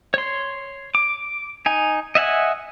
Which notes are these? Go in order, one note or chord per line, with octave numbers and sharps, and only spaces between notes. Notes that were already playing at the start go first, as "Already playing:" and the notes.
C#5 C6
D6
D#4 G#5
D#5 E5 F#5 G#5